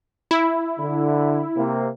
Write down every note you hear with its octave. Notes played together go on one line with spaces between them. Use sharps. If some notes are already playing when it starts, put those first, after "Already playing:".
E4
D3
C3 A#3